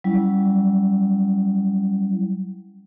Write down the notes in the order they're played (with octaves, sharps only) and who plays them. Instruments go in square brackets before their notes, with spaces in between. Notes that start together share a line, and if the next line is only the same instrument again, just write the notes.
[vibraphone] F#3 G3 C#4 E4